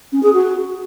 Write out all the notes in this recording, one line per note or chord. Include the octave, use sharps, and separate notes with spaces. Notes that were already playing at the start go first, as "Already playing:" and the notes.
C#4
G#4
F#4